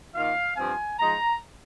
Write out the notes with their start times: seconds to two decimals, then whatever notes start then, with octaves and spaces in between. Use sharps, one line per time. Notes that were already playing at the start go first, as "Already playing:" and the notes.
0.15 D#3 A#3 F4 F5
0.57 G2 F3 C4 F4 G#5
0.99 F3 G#3 D#4 A#5